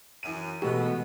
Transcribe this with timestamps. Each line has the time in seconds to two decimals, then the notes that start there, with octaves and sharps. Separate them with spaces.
0.23 F#2 E3 D#7
0.62 B2 E3 G#3 A3 B3 F#4 G4